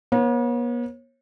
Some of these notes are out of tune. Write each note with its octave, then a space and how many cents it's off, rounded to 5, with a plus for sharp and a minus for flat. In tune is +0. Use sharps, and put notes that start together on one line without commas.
B3 -45 C#5 -35